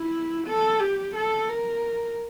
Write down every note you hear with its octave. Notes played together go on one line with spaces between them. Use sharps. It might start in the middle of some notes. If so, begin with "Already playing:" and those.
Already playing: E4
A4
G4
A4
A#4